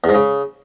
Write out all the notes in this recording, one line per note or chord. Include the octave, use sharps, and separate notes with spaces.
E2
G#2
C#3